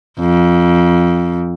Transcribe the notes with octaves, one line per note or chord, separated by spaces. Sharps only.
F2